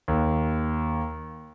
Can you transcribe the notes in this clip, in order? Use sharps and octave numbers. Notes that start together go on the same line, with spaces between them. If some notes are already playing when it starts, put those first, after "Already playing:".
D#2